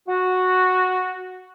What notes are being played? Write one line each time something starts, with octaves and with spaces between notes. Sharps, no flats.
F#4